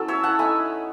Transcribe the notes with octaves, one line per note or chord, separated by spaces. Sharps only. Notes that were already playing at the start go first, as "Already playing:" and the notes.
Already playing: F#3 C#4 E4 A4
C#5 E5
F#5 A5
A3 D#4 G#5 B5